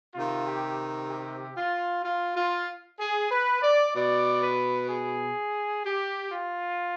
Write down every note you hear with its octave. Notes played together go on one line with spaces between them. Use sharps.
C3 D#3 F4
G4
G4
F4
F4
F4
G#4
B4
D5
B2 D5
B4
G#4
G4
F4